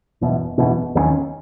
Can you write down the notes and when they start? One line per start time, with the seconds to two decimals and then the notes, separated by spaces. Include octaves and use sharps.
0.21 F#1 E2 B2
0.58 F#1 E2 B2
0.95 D#2 D#3 F#3 C#4